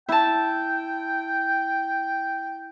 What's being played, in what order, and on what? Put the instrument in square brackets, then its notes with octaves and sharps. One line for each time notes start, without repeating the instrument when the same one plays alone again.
[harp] E4 A5 [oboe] G5